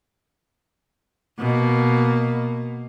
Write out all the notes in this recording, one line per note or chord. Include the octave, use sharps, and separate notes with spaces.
B2 A#3